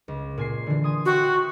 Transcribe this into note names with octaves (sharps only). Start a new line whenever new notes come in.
C#2
A#2 G#5 C7
D3 E3
G#5 C6 D#6
F#4 E5 G5 C6